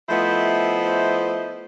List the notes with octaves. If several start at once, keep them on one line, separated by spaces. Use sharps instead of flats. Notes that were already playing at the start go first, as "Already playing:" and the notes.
F3 A3 B3 E4 C5 D#5